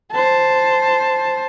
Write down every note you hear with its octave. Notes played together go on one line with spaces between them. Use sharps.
C5 A5